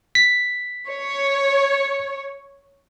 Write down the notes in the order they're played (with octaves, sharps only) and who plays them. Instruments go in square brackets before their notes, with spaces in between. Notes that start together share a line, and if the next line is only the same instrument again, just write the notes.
[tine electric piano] B6
[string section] C#5